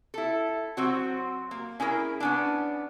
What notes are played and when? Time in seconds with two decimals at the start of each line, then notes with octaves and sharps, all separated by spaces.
0.14 E4 A4
0.77 F#3 C4 F#4
1.51 A#3
1.80 C#4 E4 G#4 A#4
2.20 B3 C#4 D4